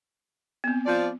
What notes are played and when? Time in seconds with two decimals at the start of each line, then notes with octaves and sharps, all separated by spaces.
0.64 B3 C4
0.86 F3 D5